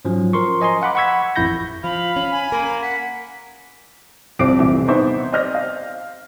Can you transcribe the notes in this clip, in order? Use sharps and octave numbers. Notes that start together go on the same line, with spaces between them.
G#2 F3 F#3 C#4
F3 A#4 C6 C#6
C5 D#5 G#5 A#5 C6
F5 F#5 B5 D6
F#5 B5 C#6 E6 G#6 B6
A1 F2 E4 B5 G6 A#6
F3 F5 B5
C#4
G#5
A#3 A#4 B5
F#5 B6
C2 F2 C4 D6 C7 D7
D#1 A1 E2 C3 E5
B3 C4 D#4 C5 E5 C#6
C5 D5 D#5 F6 G6 A#6
F5